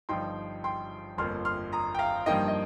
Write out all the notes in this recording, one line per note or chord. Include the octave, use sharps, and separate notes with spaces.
G1 G2 F3 D#4 G5 C6
G5 C6
G1 F2 F3 A#3 C6 F6
C6 F6
A#5 D#6
G5
F5 A#5
G2 F3 A#3 D#4 D#5 G5
D#5